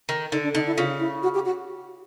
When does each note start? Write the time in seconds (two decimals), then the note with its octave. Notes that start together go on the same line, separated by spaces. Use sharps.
0.09 D#3
0.32 D3 D#4
0.44 D4
0.54 D3 D#4
0.67 E4
0.77 C#3 F4
1.00 E4
1.23 F#4
1.35 G4
1.45 F#4